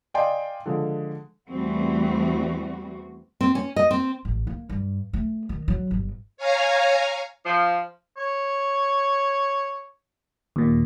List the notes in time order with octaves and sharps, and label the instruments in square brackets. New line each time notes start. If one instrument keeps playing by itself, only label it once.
[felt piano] D5 D#5 F5 G5 G#5 C6
D3 F3 G#3
[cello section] E2 E3 G3 A3 C4 F#4
[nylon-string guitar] C4
C#4
D#5
C4
[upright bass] A1
A#3
G2
A3
D#3
F#3
G1
[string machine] C#5 F5 G#5 A#5
[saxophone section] F3
[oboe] C#5
[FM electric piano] D#2 A#2